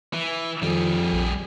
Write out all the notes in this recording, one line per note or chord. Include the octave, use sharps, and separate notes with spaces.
E3
F2 D#3 G3 G#4
A#1